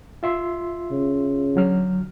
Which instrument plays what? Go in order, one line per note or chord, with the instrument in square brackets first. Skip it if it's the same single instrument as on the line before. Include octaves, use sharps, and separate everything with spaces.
[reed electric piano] F4 E5 C6
[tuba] C#3
[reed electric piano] D3 F#3 F6